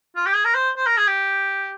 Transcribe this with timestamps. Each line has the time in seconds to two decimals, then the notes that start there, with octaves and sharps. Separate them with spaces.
0.16 F4
0.26 G4
0.35 G#4
0.45 A#4
0.55 C5
0.77 C5
0.87 A#4
0.97 G#4
1.08 G4